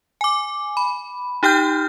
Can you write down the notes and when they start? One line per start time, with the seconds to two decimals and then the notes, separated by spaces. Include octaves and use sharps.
0.21 G#5 D6
0.77 B5
1.43 D#4 G4 G5 F6 G6